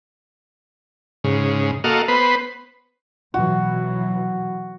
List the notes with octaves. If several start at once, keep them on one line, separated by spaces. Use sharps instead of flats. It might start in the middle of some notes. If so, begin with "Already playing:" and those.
G#2 C#3
A#3 F#4 A4 D#5 F5
B3 B4 C5
B2 E3 F#3 F#4